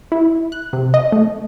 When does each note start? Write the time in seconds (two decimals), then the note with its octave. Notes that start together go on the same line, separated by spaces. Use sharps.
0.12 E4
0.52 F#6
0.73 C3
0.94 D#5
1.12 A3